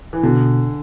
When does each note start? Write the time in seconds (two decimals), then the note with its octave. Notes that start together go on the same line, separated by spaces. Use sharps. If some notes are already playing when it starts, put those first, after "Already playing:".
0.13 E3
0.23 B2 D3